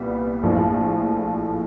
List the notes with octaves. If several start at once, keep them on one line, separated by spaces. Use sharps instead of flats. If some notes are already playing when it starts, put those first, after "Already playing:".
Already playing: C2 A#2 G3 B3
A#1 A2 F3 A3 D4